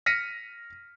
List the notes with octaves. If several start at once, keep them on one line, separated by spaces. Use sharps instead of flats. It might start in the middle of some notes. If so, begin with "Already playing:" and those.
F6 A#6 B6 C#7 D#7